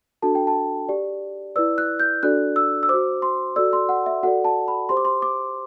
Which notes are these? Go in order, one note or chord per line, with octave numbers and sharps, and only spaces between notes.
D4 F#4 A4 A5
G5
A5
G4 D5
E4 B4 D5 E6
F#6
G6
D4 F#4 A4 D5 F#6
E6
E6
F#4 C5 D6
C6
F#4 A4 D5 E6
C6
F#5
E5
F#4 A4 D5 F#5
A5
B5
G4 C5 C6
D6
C6
D6